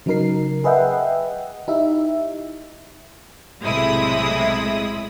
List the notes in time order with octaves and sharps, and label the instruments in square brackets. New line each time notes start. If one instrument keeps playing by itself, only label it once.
[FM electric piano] C#3 F#3 D#4 A#4 C7
G#4 B4 D#5 E5 F#5 G5
D#4 E4 G4 E5
[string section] B1 A2 C3 G#3 E4 D#6